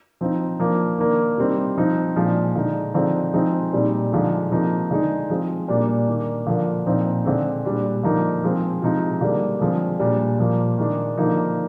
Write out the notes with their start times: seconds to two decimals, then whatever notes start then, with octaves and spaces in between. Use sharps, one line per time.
0.21 F3 C4 D#4
0.60 F3 A#3 D4
0.98 D#3 A#3 D4
1.37 C3 G3 C4 D#4
1.77 F3 C4 D#4
2.16 A#2 F3 G#3 D4
2.56 D3 G#3 D#4
2.94 D3 F3 C4 D#4
3.33 F3 G#3 C4 D#4
3.73 A#2 G3 C4 D#4
4.12 D3 F3 G#3 D#4
4.51 C3 F3 A#3 D#4
4.91 D3 G#3 D#4
5.30 F3 G#3 C4
5.68 A#2 G3 A#3 D4
6.07 D#3 A#3 D4
6.47 D3 F3 A#3
6.86 A#2 F3 C4 D#4
7.25 D3 G#3 C4
7.65 A#2 G3 D4
8.03 D3 F3 A#3 D#4
8.44 F3 G#3 C4
8.82 C3 F3 G#3 D#4
9.21 D3 G3 A#3 D4
9.61 D3 F3 G#3 C4
9.99 A#2 G3 D4
10.39 A#2 F3 A#3
10.78 D#3 G#3 D4
11.17 D3 F3 A#3 D#4